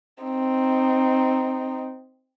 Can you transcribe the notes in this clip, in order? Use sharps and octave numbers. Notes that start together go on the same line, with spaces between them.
C4 D#4